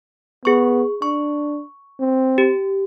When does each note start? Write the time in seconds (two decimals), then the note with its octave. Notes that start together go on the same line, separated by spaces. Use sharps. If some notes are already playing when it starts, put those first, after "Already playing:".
0.45 B3 G#4 C#6
1.02 D4 C#6
2.00 C4
2.38 G4